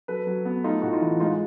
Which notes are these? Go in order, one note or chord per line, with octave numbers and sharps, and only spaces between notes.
F#3 A4 B4
F#3
B3
A3 D#4 F4
A2 F#4
D#4 F4
E3
G#3 D#4 F4